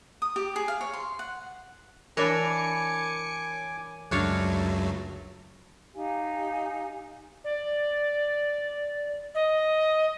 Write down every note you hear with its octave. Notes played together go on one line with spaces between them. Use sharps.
D#6
G4
G#4
F5
C#5
C6
F#5
E3 D4 A#4 C#5 G#5 B5 D6 C#7
C#2 F#2 F#3 A3 D4 A4 C#5 F5
D#4 G4 F5 G#5
D5
D#5